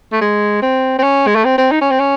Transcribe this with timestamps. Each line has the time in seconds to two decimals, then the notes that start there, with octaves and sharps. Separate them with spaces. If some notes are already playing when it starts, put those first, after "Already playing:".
0.12 A3
0.21 G#3
0.62 C4
0.99 C4
1.03 C#4
1.27 G#3
1.36 A3
1.45 C4
1.58 C4
1.71 D#4
1.81 C#4
1.91 C4
1.99 C#4